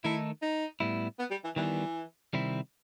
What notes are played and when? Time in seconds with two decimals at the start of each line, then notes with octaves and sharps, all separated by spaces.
0.04 D#3 A3 D#4 E4 A4
0.42 D#4
0.80 A2 G3 B3 E4
1.19 B3
1.31 G3
1.44 E3
1.56 D#3 E3 G3 B3
2.33 C3 D#3 G3 C4 E4